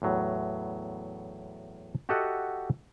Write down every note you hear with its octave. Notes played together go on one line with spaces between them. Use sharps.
E2 A2 F#3
F#4 G4 A4 D#5 E5 F#5